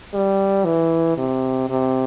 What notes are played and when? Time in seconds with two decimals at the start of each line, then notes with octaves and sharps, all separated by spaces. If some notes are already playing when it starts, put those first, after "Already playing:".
0.14 G3
0.65 E3
1.17 C3
1.70 C3